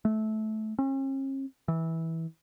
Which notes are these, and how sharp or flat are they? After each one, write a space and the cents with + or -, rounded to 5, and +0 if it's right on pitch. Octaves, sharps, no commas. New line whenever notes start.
A3 -20
C#4 -45
E3 -15